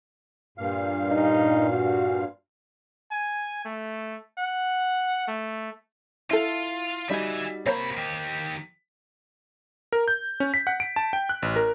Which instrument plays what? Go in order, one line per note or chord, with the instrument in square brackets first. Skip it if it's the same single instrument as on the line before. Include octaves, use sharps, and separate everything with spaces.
[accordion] G2 A#2 F5
[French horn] D#4
F#4
[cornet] G#5
A3
F#5
A3
[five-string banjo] E4 A4 [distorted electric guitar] F4
[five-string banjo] G3 D#4 F#4 [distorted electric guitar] E5 G#5
[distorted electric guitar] C3 B5 [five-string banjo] A#3 C5 C#5
[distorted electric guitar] D#3 G4
[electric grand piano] A#4
G6
C#4
B6
F#5
D7
A5
G5
F#6
A1
A#4